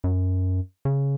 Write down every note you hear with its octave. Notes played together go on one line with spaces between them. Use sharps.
F#2
C#3